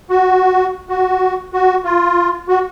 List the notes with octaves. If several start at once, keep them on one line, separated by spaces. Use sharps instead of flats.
F#4
F#4
F#4
F4
F#4